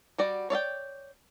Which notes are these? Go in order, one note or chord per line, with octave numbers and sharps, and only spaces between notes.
G3 F#4 D5
C#5 D5 E5 G5